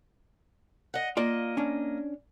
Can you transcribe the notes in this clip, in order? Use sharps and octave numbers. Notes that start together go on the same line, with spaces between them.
D#5 F#5
A#3 F4 D5 D#5
C#4 D4